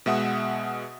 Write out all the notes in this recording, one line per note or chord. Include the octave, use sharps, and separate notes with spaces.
B2 G#3 E5 F#5 D#6